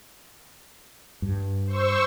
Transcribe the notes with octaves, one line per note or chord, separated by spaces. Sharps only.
G2
C5 C#6 E6